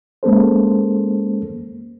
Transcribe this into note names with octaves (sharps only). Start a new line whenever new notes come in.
G#3 A#3 C#4 A4 C5